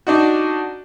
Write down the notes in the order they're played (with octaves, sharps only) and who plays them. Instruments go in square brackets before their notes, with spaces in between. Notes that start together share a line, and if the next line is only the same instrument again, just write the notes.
[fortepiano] D4 D#4 F#4